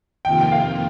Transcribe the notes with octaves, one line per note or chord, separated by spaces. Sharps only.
F2 C3 D#3 A#3 F4 G5
G5
F5